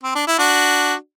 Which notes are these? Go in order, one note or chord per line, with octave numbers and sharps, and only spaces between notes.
C4
D4
E4
D4 F#4